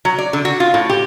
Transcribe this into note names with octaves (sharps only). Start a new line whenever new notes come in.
F#3
D5
D3
F#4
F4
A2
G4